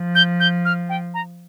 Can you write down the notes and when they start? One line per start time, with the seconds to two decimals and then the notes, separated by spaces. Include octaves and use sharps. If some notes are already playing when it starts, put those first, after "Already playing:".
Already playing: F3
0.15 G6
0.40 G6
0.65 F6
0.89 G5
1.14 A#5